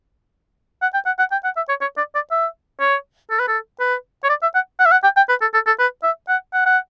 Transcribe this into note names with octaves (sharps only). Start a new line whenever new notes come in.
F#5
G5
F#5
F#5
G5
F#5
E5
C#5
C#5
D5
D5
E5
C#5
A4
B4
A4
B4
C#5
D5
E5
F#5
F#5
E5
F#5
G5
G5
B4
A4
A4
A4
B4
E5
F#5
F#5
F#5